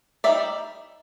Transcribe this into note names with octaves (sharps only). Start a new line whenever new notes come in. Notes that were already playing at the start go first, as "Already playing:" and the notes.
G3 C4 D#4 D5 E5